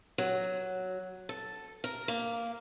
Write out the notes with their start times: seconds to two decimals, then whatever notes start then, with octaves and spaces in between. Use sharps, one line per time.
0.18 F#3
1.29 A4
1.84 A#4
2.08 A#3